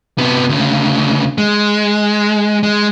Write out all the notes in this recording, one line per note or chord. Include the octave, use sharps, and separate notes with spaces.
C3 B3
D2 C#3
G#3
G#3